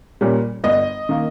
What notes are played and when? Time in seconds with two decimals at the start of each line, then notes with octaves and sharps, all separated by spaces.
0.21 A#2 G3 C#4
0.64 G1 D#5
1.09 D#3 A#3